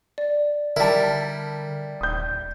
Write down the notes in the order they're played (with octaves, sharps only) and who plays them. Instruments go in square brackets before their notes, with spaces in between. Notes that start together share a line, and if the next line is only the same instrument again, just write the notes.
[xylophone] D5
[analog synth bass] D3 [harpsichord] G3 E4 [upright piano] A#4 A5
[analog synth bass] D#1 [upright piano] D#6 G6